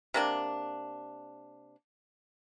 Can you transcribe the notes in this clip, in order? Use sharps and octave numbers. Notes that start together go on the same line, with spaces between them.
C3 A#3 D4